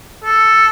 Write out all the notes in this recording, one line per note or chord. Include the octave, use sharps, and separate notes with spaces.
A4